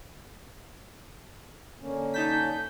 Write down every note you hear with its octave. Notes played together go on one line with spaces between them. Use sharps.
D3 A#3 C#4
D#4 A5 G6 B6